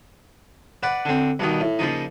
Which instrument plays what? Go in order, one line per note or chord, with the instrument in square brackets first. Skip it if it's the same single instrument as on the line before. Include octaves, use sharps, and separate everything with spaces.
[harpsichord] B4 D5 F#5
D3 C4
G2 B2 D#3
A2
A#2 C#3 F3 D#4